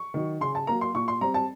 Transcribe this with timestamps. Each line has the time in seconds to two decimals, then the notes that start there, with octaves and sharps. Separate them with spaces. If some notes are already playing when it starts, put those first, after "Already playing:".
Already playing: C#6
0.14 D#3 F#3
0.41 C#3 C6
0.55 A5
0.67 F#3 A#3 A#5
0.81 C6
0.94 A#2 C#6
1.08 C6
1.21 G3 C4 A#5
1.34 A5